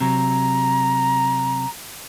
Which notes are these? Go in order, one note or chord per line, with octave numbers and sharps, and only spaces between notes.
C3 F#3 A#5